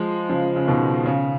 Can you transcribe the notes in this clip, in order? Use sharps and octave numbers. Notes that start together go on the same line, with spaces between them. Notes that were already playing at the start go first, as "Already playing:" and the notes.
Already playing: F3 G#3
C#3 F3
C#3
B2 D#3
C#3